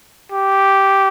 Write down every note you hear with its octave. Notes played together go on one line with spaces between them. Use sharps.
G4